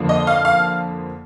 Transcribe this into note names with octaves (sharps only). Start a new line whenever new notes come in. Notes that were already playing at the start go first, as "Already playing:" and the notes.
Already playing: F2 D3 F3 A#3
D#5
F5
F5